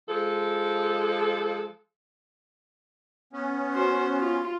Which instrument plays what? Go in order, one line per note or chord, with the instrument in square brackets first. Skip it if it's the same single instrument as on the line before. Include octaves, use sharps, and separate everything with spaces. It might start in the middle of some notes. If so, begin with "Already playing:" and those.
[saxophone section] F3 G#3 A4
[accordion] B3 C#4
[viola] F#4 C5
F4